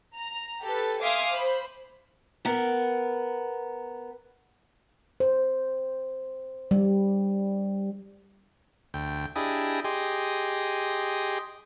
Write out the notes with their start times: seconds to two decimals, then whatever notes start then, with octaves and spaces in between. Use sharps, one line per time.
0.14 A#5
0.62 G4 A4 B4
1.00 E5 F5 G#5 C6 D6 D#6
1.32 C5 B5
2.45 B3 A#4
5.20 C5
6.71 G3
8.94 D2 G5
9.36 D4 E4 G4 G#4 D#5
9.84 G4 G#4 D#5 C6